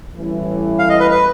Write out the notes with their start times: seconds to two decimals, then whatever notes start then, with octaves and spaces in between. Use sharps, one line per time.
0.14 A1 A2 E3 G3
0.79 F5
0.89 D#5
1.00 B4
1.11 B4